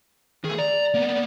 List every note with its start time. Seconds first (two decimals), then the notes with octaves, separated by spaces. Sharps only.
0.44 D#3 A3 G#4
0.58 D5 A#5
0.94 A#3 B3